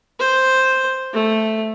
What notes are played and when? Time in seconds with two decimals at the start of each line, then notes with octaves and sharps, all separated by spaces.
0.20 C5
1.14 A3